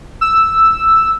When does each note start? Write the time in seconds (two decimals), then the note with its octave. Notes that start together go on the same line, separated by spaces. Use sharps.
0.21 E6